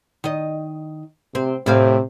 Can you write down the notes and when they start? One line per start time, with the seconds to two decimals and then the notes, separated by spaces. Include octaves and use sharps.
0.24 D#3 D#5
1.35 C3 C4
1.66 A2 C3 C4 F5